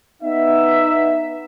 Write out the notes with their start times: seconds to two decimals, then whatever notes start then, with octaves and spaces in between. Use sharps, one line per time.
0.23 B3 D#4 E5